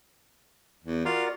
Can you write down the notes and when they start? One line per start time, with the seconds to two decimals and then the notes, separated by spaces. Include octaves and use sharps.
0.84 E2
1.05 F4 F#4 A#4 D5